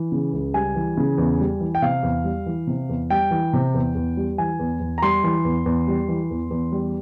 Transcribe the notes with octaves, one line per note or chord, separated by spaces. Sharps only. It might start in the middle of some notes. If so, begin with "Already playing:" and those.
Already playing: E3
C#3
C#2
G3 G#5
E3
C#3
E2
G3
E3
G5
C3 F5
E2
G3
E3
C3
E2
G3 G5
E3
C3
E2
E2
G3
E3 G#5
E2
E2
A#5
G3 C6
E3
E2
E2
G3
E3
E2
E2
G3